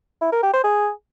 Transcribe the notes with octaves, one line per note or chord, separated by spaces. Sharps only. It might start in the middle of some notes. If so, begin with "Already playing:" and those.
E4
A#4
G4
C5
G#4